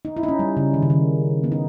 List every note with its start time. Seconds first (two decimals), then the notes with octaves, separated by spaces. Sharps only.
0.05 D#4
0.17 E4
0.23 D#4
0.28 C#4
0.39 G3
0.57 C#3
0.74 D#3
0.82 C#3
0.90 D#3
1.44 B3
1.52 D#4